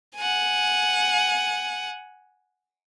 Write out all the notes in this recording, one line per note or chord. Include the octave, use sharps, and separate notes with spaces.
F#5 G#5